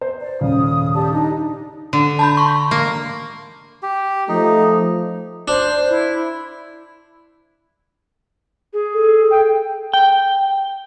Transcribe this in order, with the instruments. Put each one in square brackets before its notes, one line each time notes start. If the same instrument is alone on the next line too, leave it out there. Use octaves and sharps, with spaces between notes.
[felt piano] C5
[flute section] D5
[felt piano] D#1 C#3 [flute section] D#6
[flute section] G4 D5 A5
D4 D#4
[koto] D3
[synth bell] A5 B5 G6
C6 C#6
[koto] A#3
[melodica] G4
[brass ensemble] F3 A3 [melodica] D#4
[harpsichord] D4 [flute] C5
[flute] E4
[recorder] G#4
[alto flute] A4
[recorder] G5
[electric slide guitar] G5